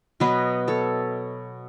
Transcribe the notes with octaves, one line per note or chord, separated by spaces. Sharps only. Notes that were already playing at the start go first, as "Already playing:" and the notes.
B2 F#3 B3 B4 D#5
A4 C#5